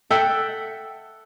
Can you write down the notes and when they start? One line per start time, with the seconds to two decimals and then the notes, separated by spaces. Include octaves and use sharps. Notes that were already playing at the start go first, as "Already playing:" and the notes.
0.11 A4 E5 F#5 G5